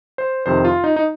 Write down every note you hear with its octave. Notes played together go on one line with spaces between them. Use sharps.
C5
F2 C3 D#3 C5
F4
D#4
D#4